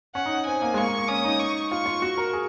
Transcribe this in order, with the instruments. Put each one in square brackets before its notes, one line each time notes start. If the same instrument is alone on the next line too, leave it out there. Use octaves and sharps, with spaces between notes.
[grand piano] C#4 [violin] F#5
[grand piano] D#4
[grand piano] C4 [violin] G#5
[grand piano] A#3
G#3
[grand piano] A#3 [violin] C#6
[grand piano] A#3
A#3
[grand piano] C#4 [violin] D#6
[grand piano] D#4
[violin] C#6
[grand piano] F4 [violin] C#6
[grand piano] F4
F#4
A#4
G#4